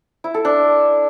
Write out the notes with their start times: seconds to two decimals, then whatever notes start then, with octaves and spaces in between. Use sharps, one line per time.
0.24 E4
0.34 A4
0.45 D4